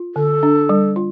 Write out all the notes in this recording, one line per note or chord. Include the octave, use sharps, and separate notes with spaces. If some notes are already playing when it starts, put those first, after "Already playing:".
Already playing: F4
D3 A4
D4
G3
F4